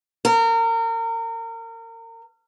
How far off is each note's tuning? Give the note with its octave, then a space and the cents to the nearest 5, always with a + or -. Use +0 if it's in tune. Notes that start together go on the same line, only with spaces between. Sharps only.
A#4 -30